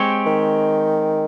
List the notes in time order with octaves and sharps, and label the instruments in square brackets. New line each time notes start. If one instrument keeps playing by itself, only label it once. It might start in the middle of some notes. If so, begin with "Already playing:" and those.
Already playing: [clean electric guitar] G#3 C4 G4 C#5
[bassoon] D#3